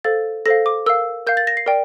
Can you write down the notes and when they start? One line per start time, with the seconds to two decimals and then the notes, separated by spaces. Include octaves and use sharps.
0.04 A4 C5 F5 A6
0.46 A4 C5 F5 A#6
0.66 D6
0.86 A#4 F5 E6
1.27 A#4 F5 G6
1.37 A6
1.47 A#6
1.57 C7
1.66 A#4 D5 G5